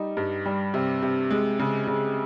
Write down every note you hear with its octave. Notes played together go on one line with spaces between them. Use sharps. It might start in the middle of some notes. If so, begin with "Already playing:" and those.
Already playing: G3 D#4
G2
G3
C3
C3
G#3
C#3
C#3